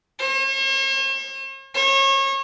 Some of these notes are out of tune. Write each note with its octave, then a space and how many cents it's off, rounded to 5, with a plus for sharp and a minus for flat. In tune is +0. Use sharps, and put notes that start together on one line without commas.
C#5 -45
C#5 -30